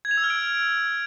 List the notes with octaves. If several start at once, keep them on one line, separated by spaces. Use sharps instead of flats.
G#6
F7
E6
F6
D7